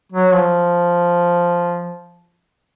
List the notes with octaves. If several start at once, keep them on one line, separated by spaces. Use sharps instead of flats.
F#3
F3